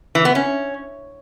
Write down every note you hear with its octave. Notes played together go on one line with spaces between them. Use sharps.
E3
B3
C#4